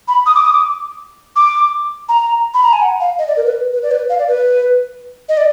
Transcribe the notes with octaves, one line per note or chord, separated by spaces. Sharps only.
B5
D#6
D6
D#6
D6
D6
A#5
B5
A#5
G#5
F#5
F5
D#5
D5
A#4
B4
B4
D5
B4
F5
D5
B4
D#5
D5